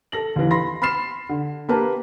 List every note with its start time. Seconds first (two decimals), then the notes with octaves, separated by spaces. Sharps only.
0.12 A4 A#6 F#7
0.36 D#2 E3
0.51 B5 C6 A#6
0.82 B5 C6 F6 A6 C7 E7
1.29 D3
1.69 A#3 G4 A#4 B4 A5 A#5